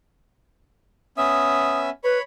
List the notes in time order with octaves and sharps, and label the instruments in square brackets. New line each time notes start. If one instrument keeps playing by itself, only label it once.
[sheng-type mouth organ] B3 C#4 E5 [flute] D#6
[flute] B4 [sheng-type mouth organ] C#5 B5